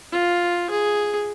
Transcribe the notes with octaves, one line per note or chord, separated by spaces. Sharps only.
F4
G#4